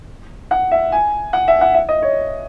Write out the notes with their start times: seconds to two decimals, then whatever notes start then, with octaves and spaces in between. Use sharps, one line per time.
0.51 F#5
0.71 E5
0.92 G#5
1.33 F#5
1.48 E5
1.61 F#5
1.74 E5
1.89 D#5
2.02 C#5